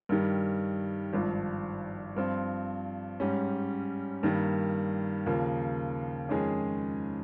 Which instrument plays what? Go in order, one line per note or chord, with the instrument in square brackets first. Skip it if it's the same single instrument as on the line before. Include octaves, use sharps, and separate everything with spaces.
[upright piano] G2 D#3 G3
G#1 G2 F3
G2 F3 C4 F4
G#2 G3 C#4
G2 D#3 G3 A#3
D#2 C#3 F3 A#3
F2 D#3 G#3 C#4 G#4